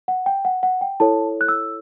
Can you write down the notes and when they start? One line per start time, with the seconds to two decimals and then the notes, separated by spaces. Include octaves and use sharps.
0.08 F#5
0.26 G5
0.45 F#5
0.63 F#5
0.81 G5
1.00 E4 A4 C#5 A5
1.41 F#6
1.48 E6